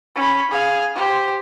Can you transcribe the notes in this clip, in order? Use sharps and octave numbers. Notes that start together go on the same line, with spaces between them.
C#4 B5
G#4 F5
G4 C5